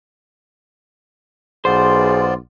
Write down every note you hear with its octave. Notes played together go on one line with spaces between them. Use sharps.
B1 B3 F4 G#4 C5 D5